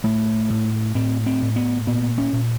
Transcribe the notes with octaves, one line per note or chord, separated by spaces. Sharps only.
A2 A3
A2
A2 C4
C4
A2
B3
A#2 B3
C#4
A#2